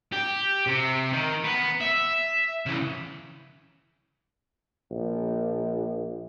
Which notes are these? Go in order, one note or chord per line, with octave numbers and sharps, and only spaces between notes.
G4
C3
D#3
B3 B4
E5
C#3 E3
A#1